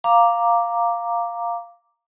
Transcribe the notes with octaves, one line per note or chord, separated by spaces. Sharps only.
F5 A#5 D6